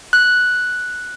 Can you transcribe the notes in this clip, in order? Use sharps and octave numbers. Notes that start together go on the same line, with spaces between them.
F#6